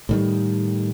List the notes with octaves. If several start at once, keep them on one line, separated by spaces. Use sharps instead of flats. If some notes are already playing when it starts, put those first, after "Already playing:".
A2 D#3 G3